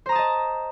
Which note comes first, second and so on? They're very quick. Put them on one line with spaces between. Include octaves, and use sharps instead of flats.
C5 A#5 D#6 A5 D#5